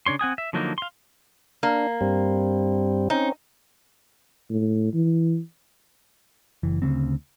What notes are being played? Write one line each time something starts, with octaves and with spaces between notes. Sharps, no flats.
C#3 D4 C#5 C6
C4 F#5 G#5 D#6
E5
D3 F3 F#3 A#3 D#4
F5 C6
A#3 D4
G2 G3 C4
C4 C#4 D#4
A2
E3
F#1 E3
D2 C#3 G3 C4